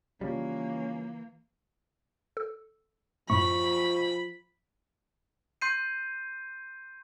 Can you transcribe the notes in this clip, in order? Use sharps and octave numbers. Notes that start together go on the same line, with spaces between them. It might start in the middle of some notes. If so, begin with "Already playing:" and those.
C#3 E3 F3 G3 A#3 C#4
A4
F#2 A2 F3 A3 B5 C#6
C6 G6 C7 D#7